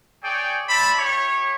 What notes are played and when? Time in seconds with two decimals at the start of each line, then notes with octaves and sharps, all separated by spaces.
0.23 G#4 C#5 D5 G5
0.68 C5 D5 E5 A5 B5
0.98 E4 G4 C#5